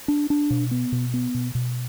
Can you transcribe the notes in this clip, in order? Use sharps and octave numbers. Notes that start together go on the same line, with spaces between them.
D4
D4
B2
B3
B2
B3
B2
B2